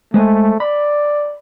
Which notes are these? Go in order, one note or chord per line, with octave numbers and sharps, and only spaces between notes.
G#3 A3 C5 G#5
D5 B5